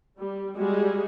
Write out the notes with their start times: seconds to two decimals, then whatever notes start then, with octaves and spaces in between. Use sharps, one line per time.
0.17 G3
0.56 G3 G#3 F#4 G#4